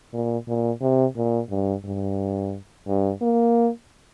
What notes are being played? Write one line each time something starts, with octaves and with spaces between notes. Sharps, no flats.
A#2
A#2
C3
A#2
G2
G2
G2
A#3